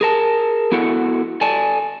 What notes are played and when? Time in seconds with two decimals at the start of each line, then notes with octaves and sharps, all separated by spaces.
0.01 G#4 A#4 A5
0.72 B3 E4 F#4 A4 F#5
1.41 A4 D5 G#5 A5